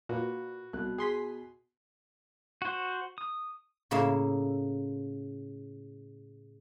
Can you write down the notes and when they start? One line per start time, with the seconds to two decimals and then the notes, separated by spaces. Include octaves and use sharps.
0.09 A#2 F#4 B4
0.73 C2 B2 F#6
0.98 G#4 C6 B6
2.62 F#4 C5
3.18 D#6
3.91 A2 C#3 A#3 E5